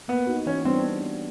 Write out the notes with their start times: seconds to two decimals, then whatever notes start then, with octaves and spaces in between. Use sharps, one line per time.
0.08 A#3 B3
0.27 D#4 F#4
0.46 E3 C#4
0.65 G3 B3 C4 D4